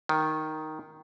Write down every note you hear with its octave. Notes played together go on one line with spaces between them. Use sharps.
D#3